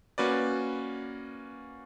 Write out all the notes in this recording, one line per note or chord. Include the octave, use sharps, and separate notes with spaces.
A#3 C#4 F#4 B4 D5